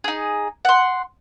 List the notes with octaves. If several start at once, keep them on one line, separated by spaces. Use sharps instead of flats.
D#4 G#4
F#5 C6